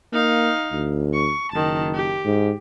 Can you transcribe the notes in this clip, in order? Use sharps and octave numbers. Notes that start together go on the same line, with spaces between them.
A#3 D#4 F5
D2
C#6
F#1 D#3 A5
G4
G#2